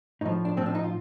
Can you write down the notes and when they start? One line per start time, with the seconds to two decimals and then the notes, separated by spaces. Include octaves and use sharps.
0.21 A2 F3 D#4
0.45 D4
0.57 A2 F3 C4
0.66 D4
0.75 D#4
0.83 F4